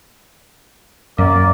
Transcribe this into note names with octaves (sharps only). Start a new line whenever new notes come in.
F#2 A#3 D5